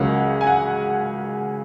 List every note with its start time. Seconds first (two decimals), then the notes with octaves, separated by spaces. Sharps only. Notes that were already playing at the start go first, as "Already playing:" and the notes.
Already playing: C#2 C#3 F#3 A#3 C#4 F#5
0.41 G#5
0.47 F#5